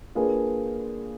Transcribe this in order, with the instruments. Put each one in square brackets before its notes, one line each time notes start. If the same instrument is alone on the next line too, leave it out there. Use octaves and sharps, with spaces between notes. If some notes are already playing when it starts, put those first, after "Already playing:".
[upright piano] A#3 D4 F4 G#4 B4